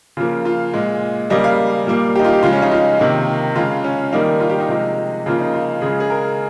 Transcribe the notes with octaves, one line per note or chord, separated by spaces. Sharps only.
C#3 F3 A#3 F4
F4
A#2 G#3
C#3 G3 A#3 D#5
F5
A#2 G3 A#3
D#4 G4
F4
G4
C#3 F3 G#3 F4
C#4
D#4
F4
C3 D#3 A#3
C#3 G#3 F4
C#4
D#3 G3 A#3 D#4
F4
G4
D#4
C3 F3 G#3
C#3 F3 A#3 F4
D#4
F4
C#3 G#3 G#4
G#4
A#4